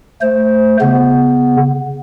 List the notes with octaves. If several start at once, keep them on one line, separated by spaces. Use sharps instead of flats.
A3 C5
C#3 B3